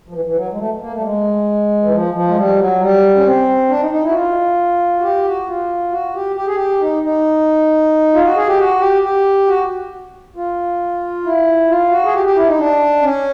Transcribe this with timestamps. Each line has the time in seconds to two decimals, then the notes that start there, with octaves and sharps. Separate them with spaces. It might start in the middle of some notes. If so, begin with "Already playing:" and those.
0.09 F3
0.13 E3
0.25 E3
0.36 F#3
0.52 G#3
0.58 A3
0.80 A#3
0.91 A3
0.98 G3
1.03 G#3
1.83 E3
1.92 F3
2.14 F3
2.28 G#3
2.36 G3
2.58 F#3
2.80 G3
3.16 C#4
3.25 C4
3.69 D4
3.80 D#4
3.91 D#4
4.02 E4
4.09 F#4
4.14 F4
4.98 F#4
5.03 G4
5.25 F#4
5.47 F4
5.91 F#4
6.14 G4
6.36 G4
6.46 G#4
6.55 G4
6.80 D#4
7.03 D#4
8.14 F4
8.25 F#4
8.36 G#4
8.47 G4
8.58 F#4
8.80 G4
9.03 G4
9.47 F#4
10.36 F4
11.25 E4
11.70 F4
11.91 F#4
12.05 G#4
12.14 G4
12.25 G4
12.36 E4
12.47 D#4
12.58 D4
13.02 C#4